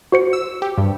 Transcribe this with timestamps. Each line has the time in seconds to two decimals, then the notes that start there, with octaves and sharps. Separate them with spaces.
0.12 F#4 C5 C#7
0.33 E6
0.62 G4
0.78 G2